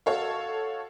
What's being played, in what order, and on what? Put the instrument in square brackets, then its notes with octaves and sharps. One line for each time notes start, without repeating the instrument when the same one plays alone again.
[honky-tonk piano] F#4 A4 C#5 F5